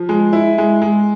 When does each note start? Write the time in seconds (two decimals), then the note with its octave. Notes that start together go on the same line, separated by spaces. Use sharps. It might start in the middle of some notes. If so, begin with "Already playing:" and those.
Already playing: F3
0.09 G#3
0.33 E4
0.58 G#3
0.82 G#3